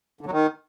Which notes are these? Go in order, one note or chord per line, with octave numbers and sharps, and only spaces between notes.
D3
F#3
D#3